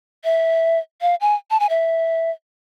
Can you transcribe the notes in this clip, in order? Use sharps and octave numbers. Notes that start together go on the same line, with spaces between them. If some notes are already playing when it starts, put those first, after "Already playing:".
E5
F5
G#5
A5
G#5
E5